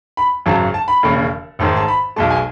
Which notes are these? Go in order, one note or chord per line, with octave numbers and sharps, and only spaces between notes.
B5
G#1 F#2 C#3 F#3 A5
A5
B5
E1 D#2 C#3
A1 G#2 D#3 G#3 A5
A5
B5
B1 B2 G#3 A5
G#5